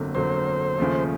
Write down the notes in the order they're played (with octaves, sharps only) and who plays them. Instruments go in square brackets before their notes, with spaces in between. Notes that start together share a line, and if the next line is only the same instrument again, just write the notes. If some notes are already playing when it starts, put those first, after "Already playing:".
Already playing: [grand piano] G1 F2 D3 F#3 A#3
[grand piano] G1 F2 D3 F#3 A#3 [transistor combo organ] C5
[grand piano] D#2 C#3 F3 A3